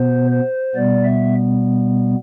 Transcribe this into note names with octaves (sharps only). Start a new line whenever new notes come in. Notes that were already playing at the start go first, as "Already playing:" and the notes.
Already playing: B2 B3 C5
C5
B2 G3 B3 D5
E5